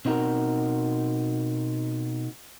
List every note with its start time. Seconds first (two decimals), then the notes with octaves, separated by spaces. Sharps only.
0.05 B2 C4 D#4 F#4 A#4